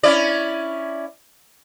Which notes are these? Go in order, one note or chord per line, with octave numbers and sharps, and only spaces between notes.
C#4 E4 D5